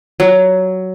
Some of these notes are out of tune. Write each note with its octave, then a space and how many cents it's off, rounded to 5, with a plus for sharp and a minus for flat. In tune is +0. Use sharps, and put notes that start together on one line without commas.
F#3 +10